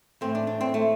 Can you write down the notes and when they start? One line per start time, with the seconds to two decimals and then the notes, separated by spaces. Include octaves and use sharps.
0.21 A2 E3 C4
0.35 D4
0.47 D4
0.61 C4
0.74 A3